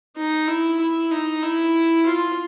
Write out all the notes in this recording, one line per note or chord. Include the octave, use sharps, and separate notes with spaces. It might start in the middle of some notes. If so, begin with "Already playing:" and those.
D#4
E4
E4
D#4
E4
F4